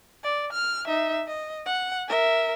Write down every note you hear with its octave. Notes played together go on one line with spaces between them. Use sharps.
D5
F6
D#4 E5
D#5
F#5
A#4 E5